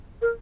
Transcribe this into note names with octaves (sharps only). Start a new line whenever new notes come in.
A#4